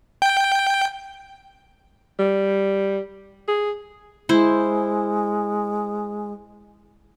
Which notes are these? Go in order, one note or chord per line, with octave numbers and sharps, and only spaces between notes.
G5
G3
G#4
G#3 E4 C5